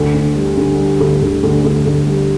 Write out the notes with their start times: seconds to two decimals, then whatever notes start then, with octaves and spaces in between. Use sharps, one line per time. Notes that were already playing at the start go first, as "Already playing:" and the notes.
Already playing: D2
0.14 D3
0.36 G3
0.57 D3
0.78 G3
1.00 D2
1.21 D2
1.43 D2
1.64 D2
1.85 D2
2.07 G3